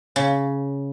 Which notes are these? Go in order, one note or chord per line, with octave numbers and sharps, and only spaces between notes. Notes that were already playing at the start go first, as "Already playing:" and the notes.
C#3